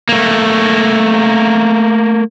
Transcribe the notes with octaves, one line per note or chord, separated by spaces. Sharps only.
A3 A#3